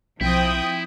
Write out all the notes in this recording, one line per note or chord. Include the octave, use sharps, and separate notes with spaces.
B1 F3 C4 E4 G5 D#6